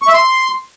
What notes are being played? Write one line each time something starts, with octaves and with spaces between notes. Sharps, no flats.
C#6
E5
C6